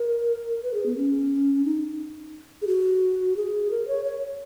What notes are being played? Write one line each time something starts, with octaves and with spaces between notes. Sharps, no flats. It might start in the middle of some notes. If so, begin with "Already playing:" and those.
Already playing: A#4
B4
G#4
B3
C#4
D#4
G#4
F#4
G#4
A#4
C#5
C#5